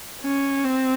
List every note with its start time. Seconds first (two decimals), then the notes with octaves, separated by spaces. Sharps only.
0.22 C#4
0.64 C4